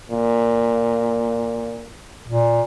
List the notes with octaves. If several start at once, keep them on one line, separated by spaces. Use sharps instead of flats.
A#2
A#2